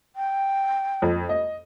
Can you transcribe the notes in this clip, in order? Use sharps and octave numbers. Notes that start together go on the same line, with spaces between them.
G5
F2
D#5